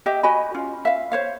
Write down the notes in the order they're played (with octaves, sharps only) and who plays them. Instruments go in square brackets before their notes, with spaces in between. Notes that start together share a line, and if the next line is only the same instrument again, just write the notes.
[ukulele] G4 D#5 E5 G5
F#4 D#5 G#5 B5
C#4 F4
E5 F5
C5 C#5 F5